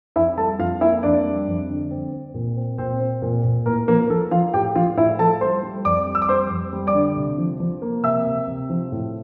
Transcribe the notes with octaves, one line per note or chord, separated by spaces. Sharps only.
F2 E4 E5
G3 A4 A5
F2 F4 F5
A#3 E4 E5
F2 D4 D5
G3
F2
D3
C4
C4
A#2
C4
A#2 C4 C5
C4
A#2
A#2
A2 A#3 A#4
F3 A#3 A#4
F3 A4
F3 F4 F5
A2 G4 G5
F3 F4 F5
A2 E4 E5
F3 A4 A5
G3 C5 C6
G3
F2 D5 D6
G3
E6
D6
G3 C5 C6
F2
G3
D5 D6
D3
C3
F3
F3
A#3
C3 E5 E6
C3
C3
F3
A2